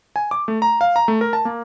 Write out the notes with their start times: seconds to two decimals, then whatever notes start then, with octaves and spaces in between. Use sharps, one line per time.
0.16 G#5
0.31 D6
0.48 A3
0.62 A#5
0.81 F5
0.96 A#5
1.08 A3
1.21 A#4
1.33 A5
1.45 A#3